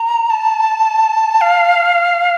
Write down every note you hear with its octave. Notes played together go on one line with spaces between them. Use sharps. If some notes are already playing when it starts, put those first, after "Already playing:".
Already playing: A#5
A5
F5